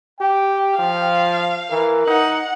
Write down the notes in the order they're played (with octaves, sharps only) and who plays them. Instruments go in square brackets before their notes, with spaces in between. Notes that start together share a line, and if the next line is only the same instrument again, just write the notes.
[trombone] G4 [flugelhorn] G5
[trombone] F3 [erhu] F5
[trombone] E3 [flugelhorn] A#4
[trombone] D#4 [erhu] F#5